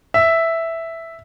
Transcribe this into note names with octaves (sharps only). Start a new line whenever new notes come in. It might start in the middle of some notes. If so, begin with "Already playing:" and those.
E5